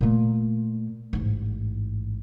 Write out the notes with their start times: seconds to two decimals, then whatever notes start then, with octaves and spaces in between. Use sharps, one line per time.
0.01 A#2 A3
1.13 A1 G#2